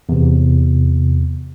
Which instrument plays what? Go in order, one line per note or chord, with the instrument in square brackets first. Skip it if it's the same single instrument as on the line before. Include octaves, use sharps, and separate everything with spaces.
[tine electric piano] E2 C3